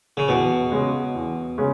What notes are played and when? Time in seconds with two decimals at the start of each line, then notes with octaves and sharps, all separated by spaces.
0.17 C#3
0.28 E2 B2
0.72 C#3 G#3 C#4 F#4
1.15 E2
1.58 C#3 G#3 C#4